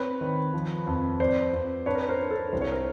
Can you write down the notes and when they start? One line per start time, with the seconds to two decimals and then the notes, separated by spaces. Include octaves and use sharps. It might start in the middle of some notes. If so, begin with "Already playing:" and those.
Already playing: C4 B4 C#5
0.21 D#3
0.54 F3
0.87 F2
1.19 F2 C5 D5
1.53 F2
1.86 D4 B4 C#5
1.95 A#4
2.01 B4
2.09 A#4 C5
2.19 D4
2.31 A4 B4
2.52 C2 C5
2.61 C#5
2.71 A#4 C5